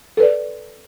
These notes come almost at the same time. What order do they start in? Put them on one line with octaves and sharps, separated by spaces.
A4 B4 D5